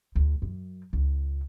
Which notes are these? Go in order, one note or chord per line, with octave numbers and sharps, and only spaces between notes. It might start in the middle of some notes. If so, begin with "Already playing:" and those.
D2
F#2
C#2